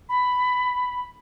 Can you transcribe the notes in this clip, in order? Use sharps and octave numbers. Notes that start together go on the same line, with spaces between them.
B5